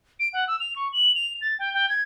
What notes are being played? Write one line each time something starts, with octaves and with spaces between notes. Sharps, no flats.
D7
F#5
E6
F7
C#6
F#7
F7
A6
G5
G5
G#6